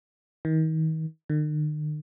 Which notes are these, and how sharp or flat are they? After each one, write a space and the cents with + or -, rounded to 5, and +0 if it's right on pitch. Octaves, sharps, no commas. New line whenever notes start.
D#3 +35
D#3 -45